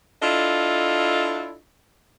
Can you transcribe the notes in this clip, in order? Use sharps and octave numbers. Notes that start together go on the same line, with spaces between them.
D4 E4 F4 A4 D#5